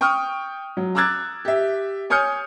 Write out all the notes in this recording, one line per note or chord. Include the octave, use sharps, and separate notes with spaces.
G5 C#6 D#6 F6
F#3
A#5 D6 E6 F#6 G#6 A6
G4 E5
C#5 G#5 D#6 F6 G6 C#7